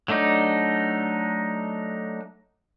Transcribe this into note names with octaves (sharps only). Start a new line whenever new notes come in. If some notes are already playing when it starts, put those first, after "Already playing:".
F#3 A3 D4 D#4